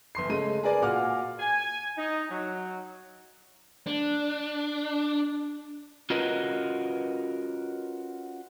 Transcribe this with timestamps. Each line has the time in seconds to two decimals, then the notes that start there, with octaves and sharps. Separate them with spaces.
0.15 G1 C6 C7
0.29 C#3 G#3 A3 D#7
0.63 G#4 A#4 B4 D5 G#5
0.82 A#2 F#4 F5 F#5 D6 F6
1.38 G#5
1.97 D#4
2.29 F#3
3.87 D4
6.10 C#4 F4 F#4 A#4 B4 D#5